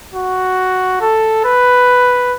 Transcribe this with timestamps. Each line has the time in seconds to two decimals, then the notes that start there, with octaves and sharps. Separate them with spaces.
0.14 F#4
1.01 A4
1.45 B4